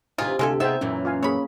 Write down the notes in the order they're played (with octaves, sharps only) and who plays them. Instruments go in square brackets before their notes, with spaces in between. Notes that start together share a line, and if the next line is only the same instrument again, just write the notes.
[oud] D2 C3 E3 [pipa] D#3 F4 G#4
[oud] D2 G4 A4 [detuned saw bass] C3 [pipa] G#3 F4 G#5
[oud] B3 C4 G#4 [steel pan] D#4 C5 G5 [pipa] E5
[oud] F#2 A#2 E3 [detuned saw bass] C#4
[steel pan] F4 F5 G#5
[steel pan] A#3 G#4 [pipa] C#5 B5